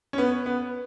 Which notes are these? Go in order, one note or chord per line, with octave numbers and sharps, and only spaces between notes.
C#4
B3
B3